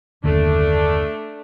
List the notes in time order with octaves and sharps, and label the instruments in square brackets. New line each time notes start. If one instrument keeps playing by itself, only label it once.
[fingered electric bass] F#1 D#2 D3 [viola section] A3 D4